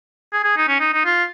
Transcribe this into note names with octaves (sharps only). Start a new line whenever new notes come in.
G#4
G#4
D#4
C#4
D#4
D#4
F4